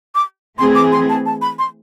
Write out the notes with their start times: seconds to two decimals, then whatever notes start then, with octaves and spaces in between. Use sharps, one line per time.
0.15 D6
0.58 E3 A3 C4 G#4 C6
0.75 D6
0.92 C6
1.09 A5
1.26 A5
1.42 B5
1.59 C6